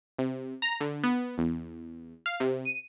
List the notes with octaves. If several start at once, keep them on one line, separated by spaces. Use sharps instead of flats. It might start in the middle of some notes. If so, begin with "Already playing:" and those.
C3
A#5
D3
B3
E2
F5
C3
D#7